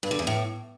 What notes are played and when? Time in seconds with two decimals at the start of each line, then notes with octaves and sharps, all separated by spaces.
0.03 G2
0.11 D3
0.19 E2
0.27 A2